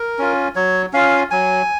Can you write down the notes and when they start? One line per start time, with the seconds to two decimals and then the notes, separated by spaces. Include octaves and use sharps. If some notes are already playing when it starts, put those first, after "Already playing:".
Already playing: A#4
0.18 C#4 F4
0.56 F#3 C#5
0.93 C#4 F4 F5
1.31 F#3 G#5